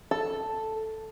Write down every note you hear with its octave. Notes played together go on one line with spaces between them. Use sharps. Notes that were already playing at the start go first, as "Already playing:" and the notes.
A4